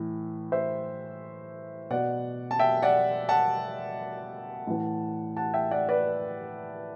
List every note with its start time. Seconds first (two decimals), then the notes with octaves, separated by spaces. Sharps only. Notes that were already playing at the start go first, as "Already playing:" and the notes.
Already playing: A2 E3
0.52 C5 E5
1.90 B2 D5 F#5
2.51 A5
2.59 E5 G5
2.82 D5 F#5
3.29 F#5 A5
4.67 A2 E3
5.37 F#5 A5
5.54 E5 G5
5.71 D5 F#5
5.89 B4 D5